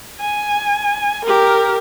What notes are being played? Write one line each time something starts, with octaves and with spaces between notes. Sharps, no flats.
G#5
G4 A#4